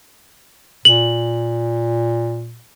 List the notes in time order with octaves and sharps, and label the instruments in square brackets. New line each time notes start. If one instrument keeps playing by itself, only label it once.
[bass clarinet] A#2 [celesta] F#7